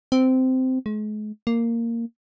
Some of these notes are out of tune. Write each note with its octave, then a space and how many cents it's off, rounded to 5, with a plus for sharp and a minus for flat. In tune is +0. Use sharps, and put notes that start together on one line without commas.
C4 -15
G#3 +40
A#3 -10